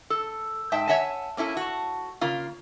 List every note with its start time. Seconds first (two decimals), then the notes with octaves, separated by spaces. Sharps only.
0.10 A4
0.72 G#2 E5 G5 A5
0.87 C#5 D#5 E5 F#5 G#5 A5
1.37 A#3 C#4 E4 A4
1.57 F#4 A5
2.21 C#3 A#3 F4